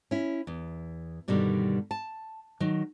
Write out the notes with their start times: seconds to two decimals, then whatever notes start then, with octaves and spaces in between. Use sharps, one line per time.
0.11 C#4 E4
0.47 E2
1.28 G2 B2 D3 D#3 G3
1.91 A5
2.60 D#3 F#3